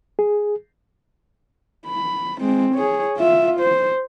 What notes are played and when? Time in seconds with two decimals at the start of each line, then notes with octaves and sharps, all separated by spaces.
0.19 G#4
1.87 B5
2.41 G#3 C4
2.75 G#4 C#5
3.18 F4 E5
3.61 C5